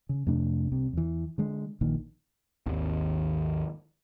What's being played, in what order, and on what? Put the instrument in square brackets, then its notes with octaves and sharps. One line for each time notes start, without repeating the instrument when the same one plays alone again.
[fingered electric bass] C#3
F2 C3 A3 D4
C2 C3
E2 E3
D3 G#3
A#1 A#2 D#3
[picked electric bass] G#1 D#2